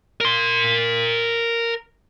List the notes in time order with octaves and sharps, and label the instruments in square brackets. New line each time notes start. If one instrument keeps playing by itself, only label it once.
[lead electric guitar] A#4 C6